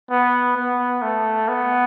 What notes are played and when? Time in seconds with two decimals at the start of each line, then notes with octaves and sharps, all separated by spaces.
0.11 B3
0.57 B3
1.02 A3
1.48 B3